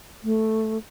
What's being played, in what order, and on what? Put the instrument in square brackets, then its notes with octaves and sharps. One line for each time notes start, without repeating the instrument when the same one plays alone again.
[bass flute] A3